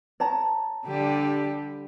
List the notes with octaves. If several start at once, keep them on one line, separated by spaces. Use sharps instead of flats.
C#5 A5 A#5
D3 G3 G4